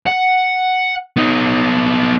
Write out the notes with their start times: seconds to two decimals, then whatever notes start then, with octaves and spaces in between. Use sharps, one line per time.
0.06 F#5
1.17 B3 D#4